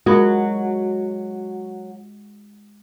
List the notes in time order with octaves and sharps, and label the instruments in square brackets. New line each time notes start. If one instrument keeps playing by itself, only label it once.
[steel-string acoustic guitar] F#3 [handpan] G#3 [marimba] F4 A#4 B5 [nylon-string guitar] F#4